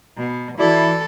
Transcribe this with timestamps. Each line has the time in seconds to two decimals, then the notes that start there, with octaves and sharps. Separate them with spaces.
0.18 B2
0.59 E3 E4 F#4 A4 D5 D6